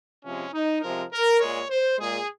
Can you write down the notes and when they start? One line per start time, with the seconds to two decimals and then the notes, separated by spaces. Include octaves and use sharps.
0.24 C3 F3 G#3 C#4
0.53 D#4
0.82 C3 F3 G#3 A#4
1.11 A#4
1.40 A#2 G#3 C#5
1.69 C5
1.98 A#2 G#3 G#4